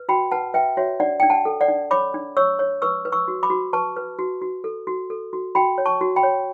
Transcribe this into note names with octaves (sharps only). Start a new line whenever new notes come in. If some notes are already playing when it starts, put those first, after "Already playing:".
Already playing: B4
F#4 G5 B5
B4 F#5 A5
B4 E5 G5
F#4 C#5 E5
D4 D5 F#5
D4 G5
F#5 A5
A4
D5 F#5
D4
C#5 B5 D6
D4
C#5 C#6 E6
C#5
B4 C#6 E6
B4
C#6 E6
F#4
B5 D6
F#4
B4 A5 C#6
B4
F#4
F#4
A4
F#4
A4
F#4
F#4 G5 B5
C#5
A5 C#6
F#4
G5 B5
C#5